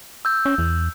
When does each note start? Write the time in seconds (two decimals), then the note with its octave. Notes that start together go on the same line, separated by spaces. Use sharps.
0.25 E6 G6
0.46 C#4
0.58 E2